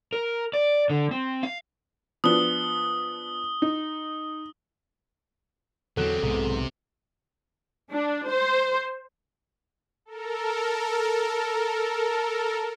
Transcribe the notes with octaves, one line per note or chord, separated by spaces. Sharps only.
A#4
D5
D3
C4
F5
F3 B3 D4 D#6 G7
D#4
E2 D3 F#3 C4 A4 F#6 E7
B1 E2 G#2 C3
D4
C5
A4 A#4